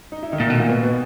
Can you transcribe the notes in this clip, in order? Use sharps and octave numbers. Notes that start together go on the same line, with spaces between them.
D#4
E4
D#3 D#4
A#2
B2 A3
A#2 A#3
B2 B3
B2 B3